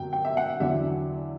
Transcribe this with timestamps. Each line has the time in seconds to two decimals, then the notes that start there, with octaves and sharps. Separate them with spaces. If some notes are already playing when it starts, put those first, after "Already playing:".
Already playing: F#2 D3 F#3 G5
0.13 G5
0.25 E5
0.37 F#5
0.60 E2 D3 F#3 E5